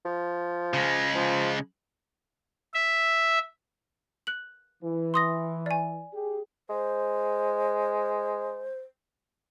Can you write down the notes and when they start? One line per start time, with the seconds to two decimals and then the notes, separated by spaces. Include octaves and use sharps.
0.05 F3
0.74 C#3 G#3
1.15 F3
2.74 E5
4.27 F#6 F#7
4.83 E3
5.14 C6 D#6 A#6
5.66 D5 G#5
6.14 G4 G#4
6.69 G#3 C5